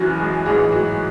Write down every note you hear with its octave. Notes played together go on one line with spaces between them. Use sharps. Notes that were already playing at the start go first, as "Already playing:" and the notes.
Already playing: F#1 F#2 E3 F#3 F#4
G#3 G#4
A1 G#2 E3 G#3 G#4
F#3 F#4